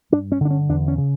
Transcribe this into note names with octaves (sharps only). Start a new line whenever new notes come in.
G2 D4
C#4
D3 D4
C#4
E2 D4
C#4
C#3